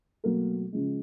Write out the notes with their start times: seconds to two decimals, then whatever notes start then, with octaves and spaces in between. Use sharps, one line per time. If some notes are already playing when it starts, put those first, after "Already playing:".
0.24 B2 F#3 A3 A#3 A#4
0.72 C#3 F3 G#3